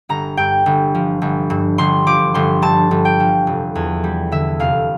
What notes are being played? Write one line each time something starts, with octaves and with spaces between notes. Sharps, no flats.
G1 A#5
G2 G5
G1
F3
G1
G2
G1 C6
F3 D6
G1 C6
G2 A5
G1
G5
F3
F1
E2
G3
D3 E5
F1 F5